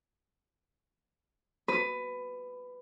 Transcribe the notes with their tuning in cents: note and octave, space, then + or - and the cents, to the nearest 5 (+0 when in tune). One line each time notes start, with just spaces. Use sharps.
B4 +15